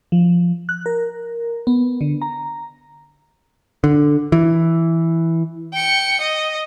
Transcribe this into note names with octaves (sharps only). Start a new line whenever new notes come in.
F3
F#6
A#4
B3
D3
A#5
D3
E3
G5 C#7
D#5